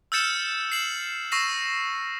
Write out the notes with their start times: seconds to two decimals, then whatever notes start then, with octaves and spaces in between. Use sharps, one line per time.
0.12 E6 F6 G6 A6 C#7 E7
0.72 C7 E7 F#7
1.32 C#6 E6 A#6 C7 E7